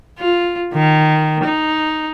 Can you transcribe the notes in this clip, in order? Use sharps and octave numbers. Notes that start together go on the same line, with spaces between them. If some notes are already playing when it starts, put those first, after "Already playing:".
F4
D#3
D#4